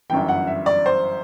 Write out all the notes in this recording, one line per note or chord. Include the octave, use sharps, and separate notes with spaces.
G1 F#2 E3 G5
F#5
E5
D5
C5